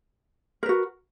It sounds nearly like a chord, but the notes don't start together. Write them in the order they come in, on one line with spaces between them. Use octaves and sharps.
A#4 B4 F#4